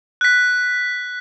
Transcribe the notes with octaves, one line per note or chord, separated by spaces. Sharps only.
F#6 B6